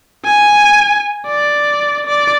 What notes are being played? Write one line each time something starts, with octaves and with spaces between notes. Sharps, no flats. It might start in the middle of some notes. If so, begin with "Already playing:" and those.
G#5
D5
D5